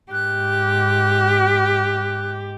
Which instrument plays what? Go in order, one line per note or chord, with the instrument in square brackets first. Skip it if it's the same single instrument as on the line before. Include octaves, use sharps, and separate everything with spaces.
[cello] G#2 G4 [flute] F#6